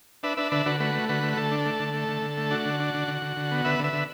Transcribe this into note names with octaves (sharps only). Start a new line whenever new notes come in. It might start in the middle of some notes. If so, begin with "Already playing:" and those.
D4 B4 E5
D4 B4 E5
D3 B4 E5
D3 F#4 B4
A3 F#4 B4
A3
D3 F#4 B4
A3
F#4
D3 A4
D4
A3
D3
A3
D3
D3
A3
D4 F#4
D3
D4
D3
D3
D3
D3
B3
D3 B4 E5
D3
B4 E5
D3